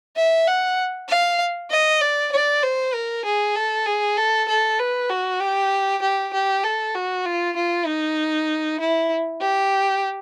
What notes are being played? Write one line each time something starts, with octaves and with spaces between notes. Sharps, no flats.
E5
F#5
F5
D#5
D5
D5
C5
A#4
G#4
A4
G#4
A4
A4
B4
F#4
G4
G4
G4
A4
F#4
F4
F4
D#4
E4
G4